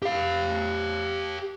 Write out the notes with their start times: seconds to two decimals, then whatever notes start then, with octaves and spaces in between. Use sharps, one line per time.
0.02 G4 F5